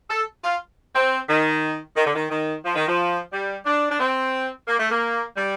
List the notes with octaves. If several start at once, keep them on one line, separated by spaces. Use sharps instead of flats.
A4
F4
C4
D#3
D#3
D3
D#3
D#3
F3
D#3
F3
G3
D4
D4
C4
A#3
A3
A#3
G3